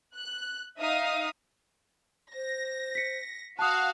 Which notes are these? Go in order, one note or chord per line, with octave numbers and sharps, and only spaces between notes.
F#6
D#4 E5 F5 D#6
C5 A#6
B6 C#7
F#4 F5 A5 D#6 F#6